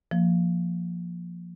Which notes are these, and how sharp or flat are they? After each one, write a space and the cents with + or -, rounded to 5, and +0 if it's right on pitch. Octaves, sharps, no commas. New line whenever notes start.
F3 +0 A#3 +0